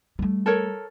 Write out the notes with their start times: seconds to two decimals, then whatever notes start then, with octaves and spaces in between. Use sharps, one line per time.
0.19 G3 A3
0.46 A4 A#4 C#5